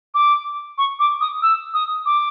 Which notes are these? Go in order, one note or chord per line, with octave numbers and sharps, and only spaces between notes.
D6
C#6
D6
D#6
E6
D#6
D6